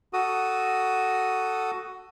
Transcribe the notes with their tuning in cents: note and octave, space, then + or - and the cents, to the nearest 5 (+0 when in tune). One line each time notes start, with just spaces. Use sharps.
F#4 +10 A4 +0 D#6 +0